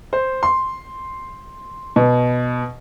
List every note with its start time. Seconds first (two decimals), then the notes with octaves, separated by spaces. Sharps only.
0.13 C5
0.43 C6
1.96 B2